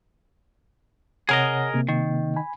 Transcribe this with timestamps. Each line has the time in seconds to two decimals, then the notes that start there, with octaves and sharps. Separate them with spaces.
1.29 C3 G#4 A#4 C#5 D#5 F#5
1.74 C3 A#3
1.89 D#3
2.36 G#5 B5